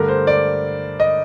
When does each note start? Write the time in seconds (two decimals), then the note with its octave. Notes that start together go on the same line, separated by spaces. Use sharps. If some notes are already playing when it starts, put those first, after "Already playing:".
Already playing: G2 D3 A3 A#4
0.08 C5
0.27 D5
1.00 D#5